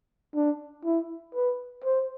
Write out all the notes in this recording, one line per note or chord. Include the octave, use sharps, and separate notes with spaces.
D4
E4
B4
C5